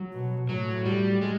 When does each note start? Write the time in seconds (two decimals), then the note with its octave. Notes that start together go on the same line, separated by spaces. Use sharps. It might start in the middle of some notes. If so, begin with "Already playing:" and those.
Already playing: F#3
0.12 B2
0.48 A2 F#3
0.85 G3
1.21 G#3